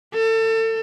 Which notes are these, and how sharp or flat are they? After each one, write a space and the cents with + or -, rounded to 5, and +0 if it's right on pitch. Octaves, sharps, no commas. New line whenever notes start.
A4 +30